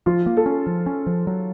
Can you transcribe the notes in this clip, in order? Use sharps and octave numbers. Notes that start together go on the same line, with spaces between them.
F3 F4
A#3
A4
C#4
F3
C#4
F3
F#3